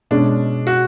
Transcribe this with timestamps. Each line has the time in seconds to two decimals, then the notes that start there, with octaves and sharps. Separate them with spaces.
0.11 B2 G#3 C#4 D4
0.67 F#4